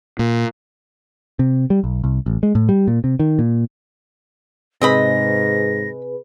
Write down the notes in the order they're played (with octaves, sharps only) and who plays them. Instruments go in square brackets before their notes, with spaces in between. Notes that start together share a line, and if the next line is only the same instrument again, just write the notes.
[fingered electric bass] A#2
[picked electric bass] C3
G3
B1
C2
A1
G#3
A2
G3
A#2
C3
D#3
A#2
[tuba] G#2 [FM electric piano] C3 G#4 B4 [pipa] C4 D#5 B5 [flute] A#6